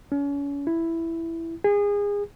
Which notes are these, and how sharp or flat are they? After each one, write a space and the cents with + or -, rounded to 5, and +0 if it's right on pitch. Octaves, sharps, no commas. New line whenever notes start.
C#4 +35
E4 +5
G#4 -30